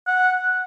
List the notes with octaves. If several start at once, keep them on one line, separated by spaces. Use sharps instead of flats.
F#5